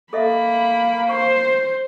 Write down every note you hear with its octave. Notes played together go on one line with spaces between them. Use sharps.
A#3 A4 D#5 E5 B5
C5 C#6